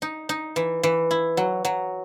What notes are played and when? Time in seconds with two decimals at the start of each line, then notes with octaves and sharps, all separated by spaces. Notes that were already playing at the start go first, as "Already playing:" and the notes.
0.02 D#4
0.29 D#4
0.56 E3
0.83 E3
1.11 E4
1.37 F#3
1.65 F#3